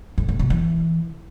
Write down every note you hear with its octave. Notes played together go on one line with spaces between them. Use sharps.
A2
A2
B2
E3